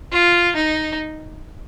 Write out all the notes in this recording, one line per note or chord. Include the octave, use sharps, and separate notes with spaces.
F4
D#4